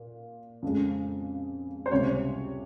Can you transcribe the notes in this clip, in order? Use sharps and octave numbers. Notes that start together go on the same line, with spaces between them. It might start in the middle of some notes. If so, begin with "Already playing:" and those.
Already playing: A#2
F2 C#3 G#3
C5
C#2 C3 G3 C#5